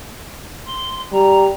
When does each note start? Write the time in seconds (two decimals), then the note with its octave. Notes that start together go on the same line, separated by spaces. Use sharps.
0.66 C6
1.12 G3 A#5